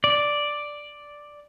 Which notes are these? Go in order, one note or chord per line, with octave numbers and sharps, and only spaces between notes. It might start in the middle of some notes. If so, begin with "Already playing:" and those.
D5